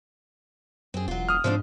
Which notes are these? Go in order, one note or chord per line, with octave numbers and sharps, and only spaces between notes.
F#2 C4 G#4
E1 F#3 F4
D#6 F6
G#2 F3 C4 D4